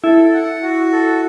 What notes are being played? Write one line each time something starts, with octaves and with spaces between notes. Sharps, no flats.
E4 A4
F#5
F#4
A4